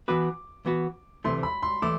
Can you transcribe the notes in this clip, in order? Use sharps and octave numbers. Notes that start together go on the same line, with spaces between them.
E3 B3 F#4 B4 D6
E3 B3 F#4 B4
D2 C3 E3 A3 E4 C6
B5
C6
E3 A3 E4 D6